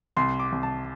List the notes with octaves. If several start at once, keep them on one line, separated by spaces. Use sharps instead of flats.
C2 C6
D6
C2
A5